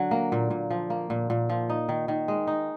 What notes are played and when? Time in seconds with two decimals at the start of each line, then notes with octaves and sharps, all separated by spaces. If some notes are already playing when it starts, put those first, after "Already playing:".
Already playing: D3 F#3 D4
0.11 A#3
0.32 A#2
0.50 A#2
0.70 F3
0.90 A#3
1.10 A#2
1.30 A#2
1.49 F3
1.69 D#4
1.89 D#3
2.08 D#3
2.28 G#3
2.47 D#4